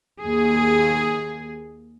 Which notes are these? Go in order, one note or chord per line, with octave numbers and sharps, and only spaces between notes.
D#2 G#4